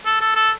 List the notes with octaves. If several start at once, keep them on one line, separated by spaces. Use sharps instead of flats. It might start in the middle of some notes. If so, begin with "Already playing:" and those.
A4
A4
A4